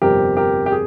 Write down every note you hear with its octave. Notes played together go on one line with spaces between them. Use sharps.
G1 F2 C3 G3 C4 G4 A#4
G4 A#4
G4
G#4